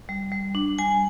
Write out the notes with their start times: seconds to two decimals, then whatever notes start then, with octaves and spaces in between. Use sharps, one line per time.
0.09 G3
0.32 G3
0.55 D4
0.78 G3 G#5